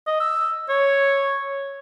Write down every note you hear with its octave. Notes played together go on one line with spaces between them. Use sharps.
D#5
E6
C#5